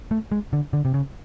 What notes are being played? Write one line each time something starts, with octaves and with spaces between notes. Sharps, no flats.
A3
G#3
D3
D3
C3
C#3